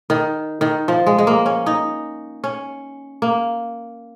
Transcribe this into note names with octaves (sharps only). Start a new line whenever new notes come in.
D#3
D#3
F3
G#3
G#3
A#3
C#4
D#4
C#4
A#3